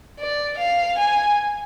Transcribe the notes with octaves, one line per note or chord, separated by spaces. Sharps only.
D5
F5
G#5